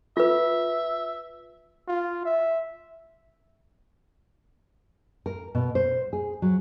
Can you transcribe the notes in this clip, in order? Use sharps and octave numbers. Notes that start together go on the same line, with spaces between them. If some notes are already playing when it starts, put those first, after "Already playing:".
F4 B4 E5
F4
E5
A#4
B2
C5
G#4
F#3